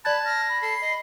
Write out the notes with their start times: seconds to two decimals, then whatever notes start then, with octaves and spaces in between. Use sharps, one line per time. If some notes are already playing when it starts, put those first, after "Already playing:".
0.05 D5 A5 B5 F#6 G#6 A6
0.25 F6 A#6
0.49 B5
0.62 A4 C7
0.82 D#5